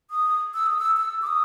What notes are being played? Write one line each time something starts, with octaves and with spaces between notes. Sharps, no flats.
D#6
E6
D#6
E6
E6
D6
D#6